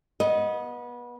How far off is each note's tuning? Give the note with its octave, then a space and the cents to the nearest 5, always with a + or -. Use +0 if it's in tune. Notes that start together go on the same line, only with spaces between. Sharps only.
B3 -25 D#5 +5